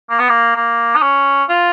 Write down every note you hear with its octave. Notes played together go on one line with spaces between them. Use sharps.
A#3
B3
A#3
A#3
D#4
C#4
F4